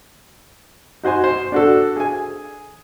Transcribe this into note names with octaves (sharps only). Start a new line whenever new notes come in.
D#4 F#4 C5 G#5 C6
C5
D4 F#4 A4
G#4 G#5